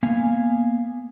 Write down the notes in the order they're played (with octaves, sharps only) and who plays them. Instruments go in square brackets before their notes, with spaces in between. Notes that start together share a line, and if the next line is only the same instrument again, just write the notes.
[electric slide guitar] A#3 B3 F5 G#5